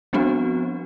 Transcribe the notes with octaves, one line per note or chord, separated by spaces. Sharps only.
F3 G3 B3 C4 D4 F#4